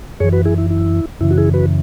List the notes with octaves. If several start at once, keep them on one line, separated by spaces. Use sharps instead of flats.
F#2 E3 G#4 C#5
F#4 B4
E4 G#4
E4
E4
F#2 C#3 E3 E4
F#4
E4 G#4
F#4 B4